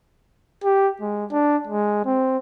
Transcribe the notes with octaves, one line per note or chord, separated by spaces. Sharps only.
G4
G#3
D4
G#3
C4